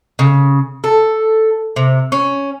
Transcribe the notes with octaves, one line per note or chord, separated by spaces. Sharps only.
C#3
A4
C3
C#4